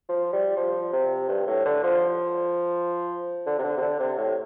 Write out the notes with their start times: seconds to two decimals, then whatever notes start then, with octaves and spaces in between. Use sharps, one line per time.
0.09 F3
0.33 G3
0.57 F3
0.93 C3
1.29 G2
1.47 A2
1.65 D3
1.83 F3
3.46 D3
3.59 C3
3.64 D3
3.77 C3
3.81 D3
3.99 C3
4.18 A2